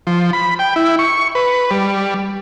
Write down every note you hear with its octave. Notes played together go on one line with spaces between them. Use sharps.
F3
B5
G5
E4
C#6
B4
G3